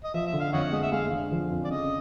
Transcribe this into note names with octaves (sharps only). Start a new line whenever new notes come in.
D#5
F3 E5
E5
D3
F5
F2 C#5 D#5 F#5
G#3 D#5
E5
G#3 F5
D3
F3
F2
D5
C#3 D#5